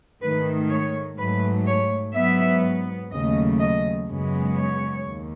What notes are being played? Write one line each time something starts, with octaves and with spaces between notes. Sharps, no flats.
G#2 D#3 A3 B4
C#5
G#2 F#3 A3 B4
C#5
G#2 F#3 B3 E5
D#2 C#3 F#3 A3 D#5
D#5
F#2 C#3 G#3 B3
C#5
D#2